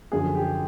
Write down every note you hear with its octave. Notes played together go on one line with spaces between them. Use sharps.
F#2 D3 F3 G#4
G4